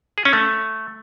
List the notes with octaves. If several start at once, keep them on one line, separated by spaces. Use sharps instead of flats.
G#4
C#4
A3